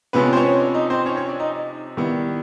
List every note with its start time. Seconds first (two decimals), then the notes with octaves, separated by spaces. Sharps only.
0.13 C3 F3 G#3 B3 C#4 B4
0.33 C5
0.37 C#4 C#5
0.60 D4 D5
0.74 D#4 D#5
0.90 C4 C5
1.06 C#4 C#5
1.17 C#4 C#5
1.29 D4 D5
1.40 D#4 D#5
1.97 D#3 G3 B3 E4